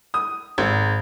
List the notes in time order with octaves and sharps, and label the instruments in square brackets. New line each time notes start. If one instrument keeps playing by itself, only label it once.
[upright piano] D#6
G#1